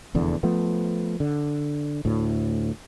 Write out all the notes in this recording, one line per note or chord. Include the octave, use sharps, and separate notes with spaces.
F1 E2 D3
F3 A3 B3
D3
D2 A2